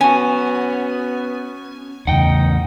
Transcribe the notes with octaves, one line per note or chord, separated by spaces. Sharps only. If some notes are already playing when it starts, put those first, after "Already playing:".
B3 C#4 F#4 G#5
E2 C#3 D#4 F#5 G5